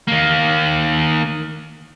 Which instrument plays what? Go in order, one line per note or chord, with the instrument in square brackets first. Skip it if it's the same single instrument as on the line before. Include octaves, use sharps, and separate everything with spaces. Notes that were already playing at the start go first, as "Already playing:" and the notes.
[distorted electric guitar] D#3 A#3